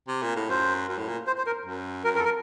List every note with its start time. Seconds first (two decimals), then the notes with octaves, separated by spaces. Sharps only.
0.08 C3
0.23 A#2
0.36 A2
0.50 F#2 C5
0.89 F#2
0.98 A2
1.08 A#2
1.27 C5
1.38 C5
1.47 A#4
1.66 F#2
2.04 F#2 A#4
2.15 F2 A#4
2.19 A4
2.25 A#4